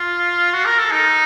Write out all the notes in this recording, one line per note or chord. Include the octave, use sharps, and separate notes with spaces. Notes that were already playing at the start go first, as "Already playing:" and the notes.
Already playing: F4
F#4
A#4
A4
D#4